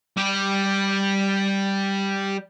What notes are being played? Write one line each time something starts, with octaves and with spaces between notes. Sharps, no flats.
G3 G4